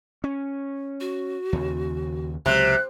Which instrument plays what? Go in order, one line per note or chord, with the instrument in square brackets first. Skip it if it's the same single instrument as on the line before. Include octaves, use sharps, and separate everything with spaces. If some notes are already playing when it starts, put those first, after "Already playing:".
[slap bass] C#4
[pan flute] F#4
[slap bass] D#2 C#3
[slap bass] C#2 F#3 [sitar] C3 [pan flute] F#6